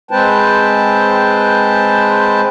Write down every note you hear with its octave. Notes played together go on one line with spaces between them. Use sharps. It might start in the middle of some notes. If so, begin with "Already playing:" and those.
G#3 C4 B4 C5 G5 A5